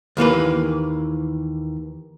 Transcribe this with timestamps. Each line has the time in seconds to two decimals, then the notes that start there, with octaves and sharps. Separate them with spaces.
0.17 D#2 E3 A#3 B4